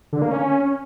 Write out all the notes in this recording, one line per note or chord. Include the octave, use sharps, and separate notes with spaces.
D3
A#3
C#4